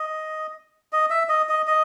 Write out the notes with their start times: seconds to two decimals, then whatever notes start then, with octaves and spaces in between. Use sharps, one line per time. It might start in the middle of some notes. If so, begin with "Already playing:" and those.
Already playing: D#5
0.93 D#5
1.10 E5
1.29 D#5
1.49 D#5
1.67 D#5